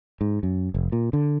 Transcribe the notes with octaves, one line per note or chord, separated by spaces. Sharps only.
G#2
F#2
F1
A#2
D3